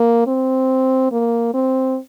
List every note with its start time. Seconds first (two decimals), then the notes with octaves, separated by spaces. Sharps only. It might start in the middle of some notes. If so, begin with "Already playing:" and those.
Already playing: A#3
0.27 C4
1.12 A#3
1.54 C4